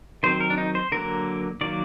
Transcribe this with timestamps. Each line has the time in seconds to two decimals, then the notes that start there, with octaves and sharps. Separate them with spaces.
0.23 D#3 F#3 C4 C5
0.40 A#4
0.50 D4
0.58 D#4
0.75 C5
0.92 D3 F#3 A#3 A#4
1.61 D#3 F#3 A#3 D5